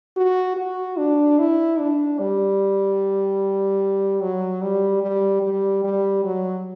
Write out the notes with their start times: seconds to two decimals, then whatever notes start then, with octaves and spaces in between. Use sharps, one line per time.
0.17 F#4
0.56 F#4
0.97 D4
1.39 E4
1.79 D4
2.20 G3
4.22 F#3
4.62 G3
5.03 G3
5.43 G3
5.84 G3
6.24 F#3